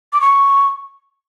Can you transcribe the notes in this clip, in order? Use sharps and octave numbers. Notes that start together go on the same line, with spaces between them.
D6
C#6